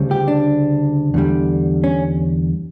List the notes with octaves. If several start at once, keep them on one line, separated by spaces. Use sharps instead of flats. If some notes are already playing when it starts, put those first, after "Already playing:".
Already playing: D2 C#3 G3
G4
D4
E2 D3 G3
C#4